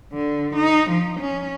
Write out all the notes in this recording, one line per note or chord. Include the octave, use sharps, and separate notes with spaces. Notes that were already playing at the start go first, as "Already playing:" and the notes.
D3
D#4
F3
C#4